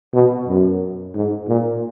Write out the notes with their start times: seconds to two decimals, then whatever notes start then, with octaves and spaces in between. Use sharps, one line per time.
0.13 B2
0.48 F#2
1.15 G#2
1.48 A#2